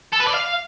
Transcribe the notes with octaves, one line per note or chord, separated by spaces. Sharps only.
A4
B4
D5
F5